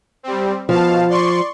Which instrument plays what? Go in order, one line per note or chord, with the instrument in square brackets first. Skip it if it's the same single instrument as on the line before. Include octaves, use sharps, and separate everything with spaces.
[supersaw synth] G3 C4
[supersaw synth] B2 F5 A5 [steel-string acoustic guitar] F3
[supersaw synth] D5 C6 C#6